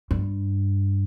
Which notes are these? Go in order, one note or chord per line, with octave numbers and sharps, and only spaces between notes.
G2